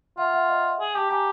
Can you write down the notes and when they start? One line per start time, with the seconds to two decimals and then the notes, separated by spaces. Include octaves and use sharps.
0.18 F4 E5 F#5
0.34 E5 F#5
0.49 D#5 F5
0.80 G#4
0.95 G4 G5 A5
1.10 G4 G#5 A#5